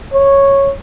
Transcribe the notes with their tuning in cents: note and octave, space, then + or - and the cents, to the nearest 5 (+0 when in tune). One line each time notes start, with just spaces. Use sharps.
C#5 -5